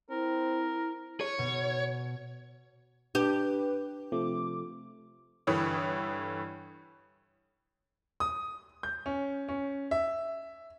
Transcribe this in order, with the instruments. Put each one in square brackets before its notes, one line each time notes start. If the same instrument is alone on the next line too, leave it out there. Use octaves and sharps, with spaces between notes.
[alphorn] C4 [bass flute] E4 [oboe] A#4
[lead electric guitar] C#5
[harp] B2
[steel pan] D4 [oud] G4 [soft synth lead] B4
[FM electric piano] C3 F3 A3 [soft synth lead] D6
[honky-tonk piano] G2 D3 E3 E4 C#5 D#6
[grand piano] D#6
G6
C#4
C#4
E5